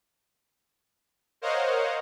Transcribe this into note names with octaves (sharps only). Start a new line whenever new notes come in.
A#4 C5 C#5 D#5 F5 F#5